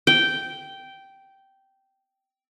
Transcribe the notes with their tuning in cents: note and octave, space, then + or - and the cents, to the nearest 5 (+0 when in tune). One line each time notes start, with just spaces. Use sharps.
G5 -10